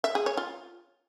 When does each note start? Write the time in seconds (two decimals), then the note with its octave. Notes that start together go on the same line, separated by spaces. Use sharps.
0.04 E5
0.15 G#4
0.26 C#5
0.37 F4